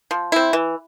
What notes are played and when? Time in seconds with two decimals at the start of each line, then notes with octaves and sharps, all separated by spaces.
0.11 F3
0.32 C4 E4
0.53 E3